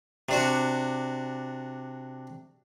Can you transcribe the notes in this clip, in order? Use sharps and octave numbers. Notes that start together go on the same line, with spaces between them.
C3 D4 F#4